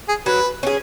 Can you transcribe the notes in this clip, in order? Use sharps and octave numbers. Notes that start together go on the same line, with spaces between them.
G#4
F#3 B4
C#4 G#4